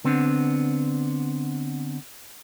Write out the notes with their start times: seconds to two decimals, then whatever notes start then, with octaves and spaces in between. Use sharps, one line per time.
0.04 D3 B3 C4 D4